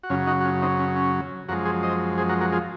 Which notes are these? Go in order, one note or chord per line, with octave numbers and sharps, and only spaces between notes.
F#4
F#2 C#3 F#3 C#4 F4
D#4 F#4
F#4
C#4 F4
C4 D#4
C#4
C#4
F#2 F3 G#3 F#4 A#4
G#4 C5
C5 D#5
G#4 C5
F#4 A#4
F#4 A#4
F4 G#4